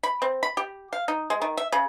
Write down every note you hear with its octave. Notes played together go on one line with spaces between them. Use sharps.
B5
C4
B5
G4
F5
D#4
G#3
D#3
E5
C#3